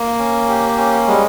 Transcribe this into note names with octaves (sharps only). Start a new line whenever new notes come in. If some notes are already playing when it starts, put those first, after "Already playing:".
Already playing: A#3
C#4
G4
C#4
G3 G#3